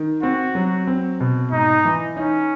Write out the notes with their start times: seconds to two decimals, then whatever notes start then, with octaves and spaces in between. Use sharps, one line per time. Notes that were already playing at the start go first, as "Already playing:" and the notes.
Already playing: D#3
0.23 C4 F#4
0.55 F#3
0.87 C4
1.20 B2
1.52 G#2 D#4
1.85 E3
2.17 C#4 D#4